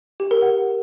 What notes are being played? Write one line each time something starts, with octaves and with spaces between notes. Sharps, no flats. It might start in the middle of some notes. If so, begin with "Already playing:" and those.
G4
A#4
F#5